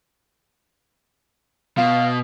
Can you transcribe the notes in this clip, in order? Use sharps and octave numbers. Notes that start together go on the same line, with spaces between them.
B2 F5